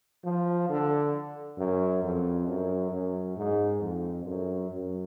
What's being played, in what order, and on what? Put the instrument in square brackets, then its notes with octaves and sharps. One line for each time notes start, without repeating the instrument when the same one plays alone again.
[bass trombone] F3
D3
F#2
F2
F#2
F#2
G#2
F2
F#2
F#2